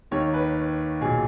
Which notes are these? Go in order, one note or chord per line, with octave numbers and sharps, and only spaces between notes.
D#2 D#3 C#5
B4
B1 A#2 G#4